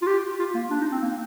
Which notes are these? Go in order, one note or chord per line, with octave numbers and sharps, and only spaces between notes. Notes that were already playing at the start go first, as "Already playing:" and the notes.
F4
G4
F4
A#3
D4
D#4
C4
A#3